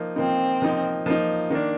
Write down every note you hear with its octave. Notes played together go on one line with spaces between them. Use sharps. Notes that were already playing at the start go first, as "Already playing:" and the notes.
Already playing: F3 A#3 D#4
F3 A#3 C4 D#4
F3 A#3 D#4
F3 A#3 D#4
D#3 A#3 D4